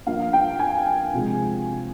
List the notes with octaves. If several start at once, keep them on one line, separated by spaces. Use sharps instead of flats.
G2 F3 A#3 F5
G5
G#5
C3 F3 G#3